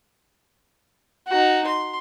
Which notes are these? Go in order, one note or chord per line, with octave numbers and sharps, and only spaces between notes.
D#4 F#4
C6